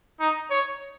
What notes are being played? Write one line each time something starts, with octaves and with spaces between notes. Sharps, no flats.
D#4
C#5